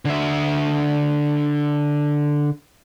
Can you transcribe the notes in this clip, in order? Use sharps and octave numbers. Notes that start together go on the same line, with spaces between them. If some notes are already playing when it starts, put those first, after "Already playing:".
D3 E5